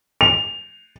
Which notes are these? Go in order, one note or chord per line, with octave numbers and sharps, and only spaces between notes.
F7